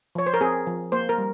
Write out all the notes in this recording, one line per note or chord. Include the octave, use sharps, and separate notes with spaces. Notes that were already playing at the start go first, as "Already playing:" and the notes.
F3 C#5
C5
A#4
C4 G#4
F3
A#3 C5
A#4
G3